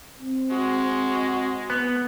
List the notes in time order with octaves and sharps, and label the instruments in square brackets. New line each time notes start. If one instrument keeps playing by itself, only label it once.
[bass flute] C4
[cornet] G#3 [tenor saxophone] F#4
[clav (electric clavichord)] B3